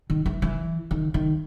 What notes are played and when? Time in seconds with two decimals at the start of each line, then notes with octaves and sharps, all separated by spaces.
0.10 D#3
0.26 E3
0.42 E3
0.91 D#3
1.14 D#3